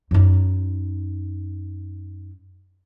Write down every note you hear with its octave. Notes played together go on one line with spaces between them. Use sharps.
F#2 D#4